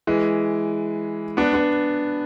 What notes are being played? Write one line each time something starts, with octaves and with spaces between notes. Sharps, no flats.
E3 G#3
B3 D4
B3 D4